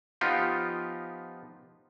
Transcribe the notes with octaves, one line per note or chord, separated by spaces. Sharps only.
F3 B3 D#4 F4 G4